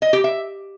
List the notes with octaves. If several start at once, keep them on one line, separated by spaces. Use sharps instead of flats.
D#5
G4
E5